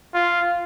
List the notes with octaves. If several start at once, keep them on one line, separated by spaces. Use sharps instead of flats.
F4